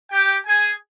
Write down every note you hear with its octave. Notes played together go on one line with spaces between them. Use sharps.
G4 G5
G#4 G#5